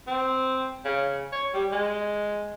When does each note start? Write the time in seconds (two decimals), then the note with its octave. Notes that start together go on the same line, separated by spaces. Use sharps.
0.07 C4
0.85 C#3
1.33 C#5
1.54 G3
1.72 G#3